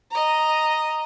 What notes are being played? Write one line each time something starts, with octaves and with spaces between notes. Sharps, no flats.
D#5 A#5